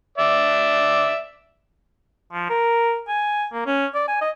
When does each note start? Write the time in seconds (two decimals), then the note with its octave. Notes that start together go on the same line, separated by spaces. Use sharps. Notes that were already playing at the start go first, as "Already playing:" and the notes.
0.18 D5 E5
2.33 F3
2.50 A#4
3.08 G#5
3.53 A#3
3.66 C#4
3.95 D5
4.08 G#5
4.21 D#5